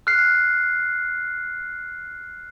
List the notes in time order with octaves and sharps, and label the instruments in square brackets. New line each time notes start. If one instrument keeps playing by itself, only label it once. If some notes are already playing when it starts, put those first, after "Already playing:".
[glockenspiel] F6 F#6 C7